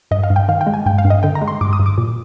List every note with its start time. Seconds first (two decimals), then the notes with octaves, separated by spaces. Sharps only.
0.11 G2 D#5
0.24 F5
0.30 G2
0.36 G5
0.48 D#3 F5
0.61 G5
0.67 G#3
0.74 G#5
0.86 G2 G5
0.98 F5
1.05 G2
1.10 D#5
1.23 D3 G5
1.35 A#5
1.42 G#3
1.48 C6
1.61 G2 D6
1.73 D#6
1.80 G2
1.86 D6
1.98 A#2